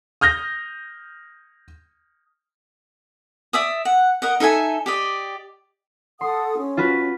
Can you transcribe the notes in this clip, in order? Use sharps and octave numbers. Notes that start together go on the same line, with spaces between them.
D#6 F6 G6 A#6
D5 E5 D#6
F#5
A#4 D#5 F#5
D#4 A4 E5 G#5
G4 D5 D#5
A4 F#5 C6 D#6
C#4
F4 F#4 B4